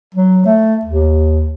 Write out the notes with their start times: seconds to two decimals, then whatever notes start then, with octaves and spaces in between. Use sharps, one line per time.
0.14 F#3
0.46 A3
0.85 D#2